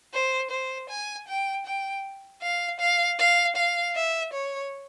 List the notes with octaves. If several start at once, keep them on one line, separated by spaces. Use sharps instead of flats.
C5
C5
G#5
G5
G5
F5
F5
F5
F5
E5
C#5